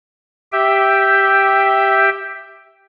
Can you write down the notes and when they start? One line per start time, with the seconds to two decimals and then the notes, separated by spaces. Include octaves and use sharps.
0.53 G4 E5 G5